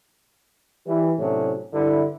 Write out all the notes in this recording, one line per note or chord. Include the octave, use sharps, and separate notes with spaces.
E3 G3
A2 C3 F#3 C#4 D4
G2 D3 E4